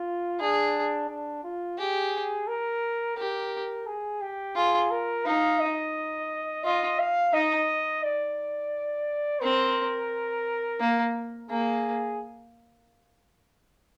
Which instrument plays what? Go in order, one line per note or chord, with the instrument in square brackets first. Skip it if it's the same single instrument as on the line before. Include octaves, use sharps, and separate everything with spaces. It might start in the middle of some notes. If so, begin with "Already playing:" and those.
Already playing: [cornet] F4
[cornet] D4 [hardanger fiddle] G#4
[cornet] D4
F4
[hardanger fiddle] G4 [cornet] G#4
[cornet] A#4
[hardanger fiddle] G4 [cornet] A#4
[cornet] G#4
G4
[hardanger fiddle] F4 [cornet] G#4
[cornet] A#4
[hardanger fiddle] D#4 [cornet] F5
[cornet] D#5
[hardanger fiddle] F4 [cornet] D#5
[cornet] F5
[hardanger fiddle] D#4 [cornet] D#5
[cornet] D5
[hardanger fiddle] C4 [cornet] A#4
[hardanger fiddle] A#3
[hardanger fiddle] A#3 [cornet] G#4